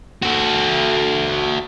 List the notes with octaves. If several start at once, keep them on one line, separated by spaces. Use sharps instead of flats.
F#4 A4